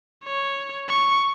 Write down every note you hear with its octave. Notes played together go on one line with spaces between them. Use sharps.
C#5
C#6